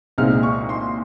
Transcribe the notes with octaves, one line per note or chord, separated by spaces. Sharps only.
C2 A#2 G#3 C4 D#4 F6
C#6
C6